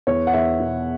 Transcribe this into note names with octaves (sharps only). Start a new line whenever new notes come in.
E2 C#5
F#5
E2 E5
B2